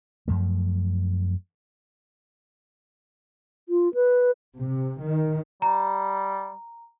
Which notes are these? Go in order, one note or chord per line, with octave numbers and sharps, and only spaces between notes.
F#2 F3 A3
F4
B4
C3
D#3
G3 A#5